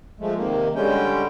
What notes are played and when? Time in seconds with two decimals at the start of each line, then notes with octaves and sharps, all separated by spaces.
0.20 F3 G#3 A3
0.37 C3 D#3 A#3
0.75 D3 G3 G#3 C#4 G5